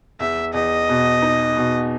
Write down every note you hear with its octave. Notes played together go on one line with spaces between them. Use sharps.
E2 E5
E2 D#5
B2
D#4
B2